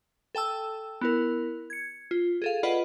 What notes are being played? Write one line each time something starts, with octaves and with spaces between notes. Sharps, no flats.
A4 G5 A5 E6
B3 E4 A#4
G#6 C#7
F4
G#4 A4 F5
F4 B4 D5 D#5 F#5 B5